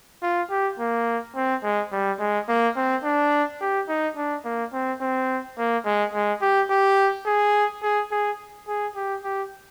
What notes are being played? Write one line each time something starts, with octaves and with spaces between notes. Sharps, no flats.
F4
G4
A#3
C4
G#3
G3
G#3
A#3
C4
D4
G4
D#4
D4
A#3
C4
C4
A#3
G#3
G#3
G4
G4
G#4
G#4
G#4
G#4
G4
G4